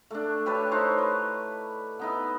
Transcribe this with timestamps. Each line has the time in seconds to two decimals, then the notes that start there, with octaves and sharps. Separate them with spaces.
0.11 A3 D4
0.46 G4 B4 C#5 A5
0.71 D#4 E4 C5 C#5
0.98 B4 D6
1.99 B3 D#4 E4